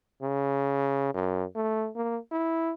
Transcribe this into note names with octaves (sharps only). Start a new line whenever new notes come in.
C#3
F#2
A3
A#3
E4